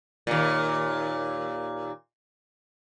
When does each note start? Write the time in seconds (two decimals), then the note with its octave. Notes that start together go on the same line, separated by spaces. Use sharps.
0.27 D#2 A#2